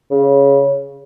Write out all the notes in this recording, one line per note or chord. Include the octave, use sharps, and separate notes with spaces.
C#3